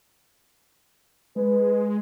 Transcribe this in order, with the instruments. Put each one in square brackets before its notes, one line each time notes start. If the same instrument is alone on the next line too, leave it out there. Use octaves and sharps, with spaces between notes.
[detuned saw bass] G#3 [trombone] B4